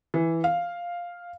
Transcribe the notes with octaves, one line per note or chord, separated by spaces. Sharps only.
E3
F5